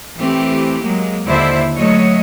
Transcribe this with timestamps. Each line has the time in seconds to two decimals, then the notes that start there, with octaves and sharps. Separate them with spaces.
0.18 E3 A3 C4 G4
0.81 F#3 G#3 A#3
1.26 D#2 D3 E4 C5 D5 E5
1.76 F#3 A3 C#5 D#5